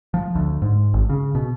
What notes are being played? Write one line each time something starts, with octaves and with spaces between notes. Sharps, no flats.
F3
D2
G#2
G#1
C#3
B2